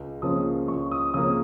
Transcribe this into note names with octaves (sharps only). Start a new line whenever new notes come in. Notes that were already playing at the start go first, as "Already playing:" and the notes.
Already playing: C#2
C#3 F3 A#3 C#4 D#6
C#2 C#6
D#6
C#3 F3 A#3 C#4 D#6